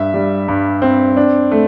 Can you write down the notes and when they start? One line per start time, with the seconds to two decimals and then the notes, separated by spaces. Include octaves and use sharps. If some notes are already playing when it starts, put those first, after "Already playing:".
Already playing: G2 E5
0.14 G3
0.48 G2
0.82 C4
1.17 D4
1.51 A3